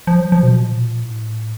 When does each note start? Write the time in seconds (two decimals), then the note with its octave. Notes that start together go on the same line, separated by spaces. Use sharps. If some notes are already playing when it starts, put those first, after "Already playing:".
0.07 F3
0.19 F#3
0.32 F3
0.43 B2
0.56 A#2
1.03 A2